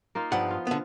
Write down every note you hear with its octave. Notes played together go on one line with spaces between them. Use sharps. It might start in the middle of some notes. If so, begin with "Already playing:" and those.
A#3 D#4 F4
G2 F3 B3 F#5
F4
D3 B3